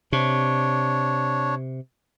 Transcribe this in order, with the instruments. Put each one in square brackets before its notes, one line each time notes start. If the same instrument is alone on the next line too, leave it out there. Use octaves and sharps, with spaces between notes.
[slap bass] C3 [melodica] D4 C#5